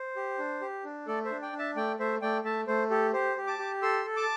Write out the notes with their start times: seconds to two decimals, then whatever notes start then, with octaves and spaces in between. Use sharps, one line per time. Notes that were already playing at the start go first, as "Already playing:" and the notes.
Already playing: C5
0.16 G4
0.39 D4
0.61 G4
0.84 D4
1.07 A3 A4 D5
1.25 C5 E5
1.31 D4
1.42 D5 G5
1.53 D4
1.59 E5 A5
1.76 A3 D5 G5
1.99 A3 C5 E5
2.22 A3 D5 G5
2.44 A3 E5 A5
2.67 A3 C5
2.90 G4 A4
3.13 G4 C5
3.37 G4
3.47 A5 D6
3.59 G4
3.82 A4 C6 E6
4.05 A4
4.16 A5 D6